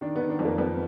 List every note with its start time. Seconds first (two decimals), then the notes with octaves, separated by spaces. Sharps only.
0.01 D#3 D4
0.16 D#3 B3
0.30 D4
0.39 F2
0.45 A#3
0.58 F2 B3